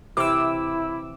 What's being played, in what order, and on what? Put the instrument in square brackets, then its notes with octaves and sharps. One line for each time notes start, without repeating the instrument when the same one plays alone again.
[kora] C3 E3 C5 [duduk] E4 [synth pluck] D6 E6